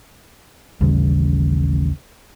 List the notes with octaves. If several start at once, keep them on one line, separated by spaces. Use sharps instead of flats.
A1 D#2 C#3 G3